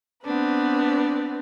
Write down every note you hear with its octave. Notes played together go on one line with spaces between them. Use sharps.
B3 C4 D4 B4